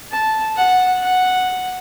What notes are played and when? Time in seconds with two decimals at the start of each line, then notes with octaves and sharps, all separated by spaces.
0.12 A5
0.56 F#5
1.02 F#5